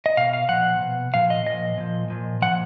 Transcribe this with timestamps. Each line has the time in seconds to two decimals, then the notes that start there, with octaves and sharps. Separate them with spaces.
0.06 D#5
0.17 B2 F5
0.33 F5
0.49 A#2 F3 F#5
0.81 B2
1.14 A#2 F3 F5
1.30 D#5
1.46 A#2 F3 D#5
1.78 A#2 F3
2.10 A#2 F3
2.42 A#2 F3 F#5